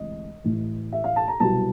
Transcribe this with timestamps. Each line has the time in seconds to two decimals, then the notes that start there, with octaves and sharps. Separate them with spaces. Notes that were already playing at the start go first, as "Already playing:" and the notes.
Already playing: D2 C3 E3 G#3 D#5
0.44 A1 A2 E3
0.92 E5
1.04 F5
1.16 A5
1.28 A#5
1.40 C2 B2 F#3 A5